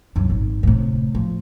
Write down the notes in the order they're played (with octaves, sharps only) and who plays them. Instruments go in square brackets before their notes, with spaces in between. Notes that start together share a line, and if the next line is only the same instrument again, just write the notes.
[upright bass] C2 F#2
G#1
A2 C3
F3